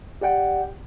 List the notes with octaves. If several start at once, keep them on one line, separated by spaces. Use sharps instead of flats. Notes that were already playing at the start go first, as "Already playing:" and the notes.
G4 D5 F#5 G5